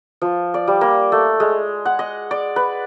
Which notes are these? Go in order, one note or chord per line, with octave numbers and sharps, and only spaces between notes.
F3
D5
G3
A#3
A3
G#3
F#5
D#5
D5
B4